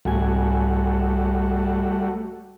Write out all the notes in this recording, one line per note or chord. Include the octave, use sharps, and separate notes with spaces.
C2 G#2 G3 A3 F#4 G#5